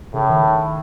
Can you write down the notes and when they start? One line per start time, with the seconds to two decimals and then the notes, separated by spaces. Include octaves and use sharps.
0.14 A2 C#3
0.30 D#3